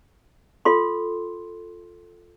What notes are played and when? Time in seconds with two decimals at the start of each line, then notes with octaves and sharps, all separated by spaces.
0.65 F4 A4 C6